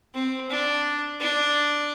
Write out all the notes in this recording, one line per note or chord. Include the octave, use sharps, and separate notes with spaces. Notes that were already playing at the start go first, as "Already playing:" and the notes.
C4
D4
D4